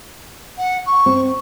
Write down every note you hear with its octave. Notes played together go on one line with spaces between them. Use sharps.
F#5
C#6
C4